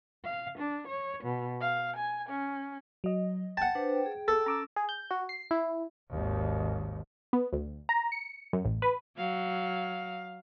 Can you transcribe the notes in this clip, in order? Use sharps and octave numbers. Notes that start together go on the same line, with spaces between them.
F5
D4
C#5
B2
F5
G#5
C#4
F#3 D#5
F#5 G5 A5
D4 B4 C5
G#4
A4
C#4 A#5 D6 E6
G#4
G6
F#4
C7
E4
G#1 D#2
B3
D2
A#5
C#7
F#2
A1
B4
F#3 F5